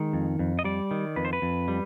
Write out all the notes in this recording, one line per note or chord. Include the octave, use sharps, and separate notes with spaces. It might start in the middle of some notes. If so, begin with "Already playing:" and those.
Already playing: D#3 G#3
F2
F2
D#5
G3 D5
D#3
F2 B4
C5
B4
F2
G3